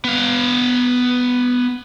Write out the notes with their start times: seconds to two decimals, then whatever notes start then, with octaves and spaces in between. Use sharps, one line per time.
0.05 B3 F5